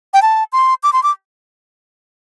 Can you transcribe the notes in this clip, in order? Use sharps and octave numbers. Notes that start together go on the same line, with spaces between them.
G5
A5
C6
D6
C6
D6